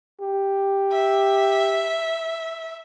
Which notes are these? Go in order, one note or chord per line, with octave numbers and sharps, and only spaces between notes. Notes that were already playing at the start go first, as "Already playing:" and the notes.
G4
E5